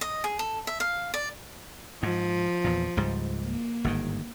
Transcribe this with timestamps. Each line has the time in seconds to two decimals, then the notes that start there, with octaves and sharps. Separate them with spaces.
0.01 D#5
0.24 G#4
0.39 A4
0.67 E5
0.80 F5
1.14 D5
2.03 G#2 F3
2.64 E2 A#2
2.97 C#2 G#2 G3
3.43 A#3
3.84 G1 G#2 D#3